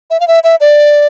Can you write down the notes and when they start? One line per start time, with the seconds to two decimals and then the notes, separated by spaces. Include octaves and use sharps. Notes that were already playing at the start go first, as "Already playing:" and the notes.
0.10 E5
0.20 F5
0.28 E5
0.44 E5
0.61 D5